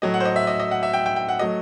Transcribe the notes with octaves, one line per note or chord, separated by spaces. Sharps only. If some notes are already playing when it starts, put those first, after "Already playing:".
A2 F#3 A3 D#5
F#5
C5
D#5
E5
D#5
D#5
F#5
E5
G5
G5
G5
F#5
F#3 A3 D#5